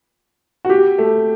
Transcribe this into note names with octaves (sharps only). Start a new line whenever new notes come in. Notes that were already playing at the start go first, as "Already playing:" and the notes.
F#4
G4
A3